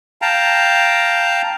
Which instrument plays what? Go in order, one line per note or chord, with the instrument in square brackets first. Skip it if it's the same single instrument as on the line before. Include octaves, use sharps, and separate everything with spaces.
[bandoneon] F5 G5 A5 A#5